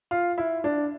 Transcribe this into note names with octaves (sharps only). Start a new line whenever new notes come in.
F4
E4
D4